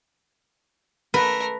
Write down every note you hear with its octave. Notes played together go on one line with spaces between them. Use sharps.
A3 A#4 B4